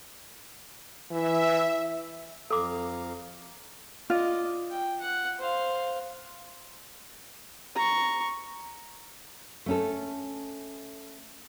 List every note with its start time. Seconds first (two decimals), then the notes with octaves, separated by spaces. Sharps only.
1.11 E3 E5
2.50 F2 A4 F5 A#5 D6
4.10 F4 D5 D#5
4.71 G5
5.01 F#5
5.39 C5 F5
7.76 A#5 C#6
9.66 A3 C#4 A4